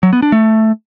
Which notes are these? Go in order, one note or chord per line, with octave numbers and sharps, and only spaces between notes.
F#3
B3
D4
A3